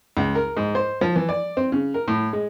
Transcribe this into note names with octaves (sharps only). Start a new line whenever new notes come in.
C#2
A#4
G#2
C5
F3
E3
D5
C4
C#3
A#4
A2
G#3